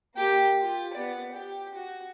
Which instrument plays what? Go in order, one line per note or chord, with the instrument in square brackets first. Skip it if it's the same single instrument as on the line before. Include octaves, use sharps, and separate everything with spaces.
[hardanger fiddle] A#3 G4
F4 G4
B3 D5
G4
F#4